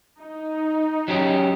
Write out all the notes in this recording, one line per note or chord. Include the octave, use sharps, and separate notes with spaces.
D#4
F#3 C#4 G4